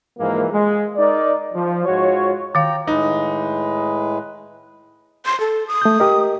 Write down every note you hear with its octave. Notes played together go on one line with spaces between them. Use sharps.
G#2 E3 F3 A#3
G#3
D#4 A#4 D5
F3
G#2 F4 F#4 C#5
D#3 F5 G5 A#5
A2 G#3 D#4 B4
C6
A4
D#6
A3 G6
G4 A#4 D#5